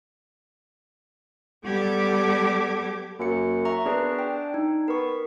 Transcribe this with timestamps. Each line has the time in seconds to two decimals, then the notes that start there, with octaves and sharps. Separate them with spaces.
1.65 G3 B3 G4 A4 D6 G#6
3.19 F#2 A#3 C#7
3.65 E5 A#5 C#6
3.85 B3 D4 G#4 B4
4.19 G5
4.54 D#4
4.88 B3 A#4 C#6